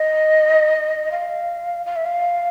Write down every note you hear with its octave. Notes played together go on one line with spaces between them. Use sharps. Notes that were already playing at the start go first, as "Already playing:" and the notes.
Already playing: D#5
F5
F5
E5
F5